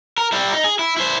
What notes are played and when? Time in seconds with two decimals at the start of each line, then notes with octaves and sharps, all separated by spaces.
0.18 A#4
0.32 G3 E4
0.53 D#4
0.64 G#4
0.79 E4
0.97 E4 C5